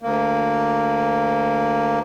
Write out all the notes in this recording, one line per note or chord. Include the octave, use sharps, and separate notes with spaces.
D2 A#3